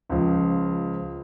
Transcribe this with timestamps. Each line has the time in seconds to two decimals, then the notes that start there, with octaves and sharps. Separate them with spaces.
0.09 C#2 F3